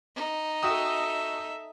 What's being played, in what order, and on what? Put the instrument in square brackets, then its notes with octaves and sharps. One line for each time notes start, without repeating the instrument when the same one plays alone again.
[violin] D#4
[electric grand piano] F#4 G5 D#6 [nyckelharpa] A4 E5